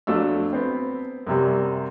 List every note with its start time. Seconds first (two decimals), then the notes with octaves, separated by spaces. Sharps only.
0.07 F2 F#3 A3 D4 E6
0.53 B3 C4
1.27 F#2 C3 G3